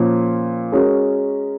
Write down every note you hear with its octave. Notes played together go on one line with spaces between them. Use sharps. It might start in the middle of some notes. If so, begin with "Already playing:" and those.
Already playing: A#2 F3 A#3 C#4
G#3 C#4 F#4 A#4